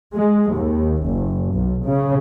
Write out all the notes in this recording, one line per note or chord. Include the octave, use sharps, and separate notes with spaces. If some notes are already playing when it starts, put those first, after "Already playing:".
G#3
D#2
F#1
B1
C#3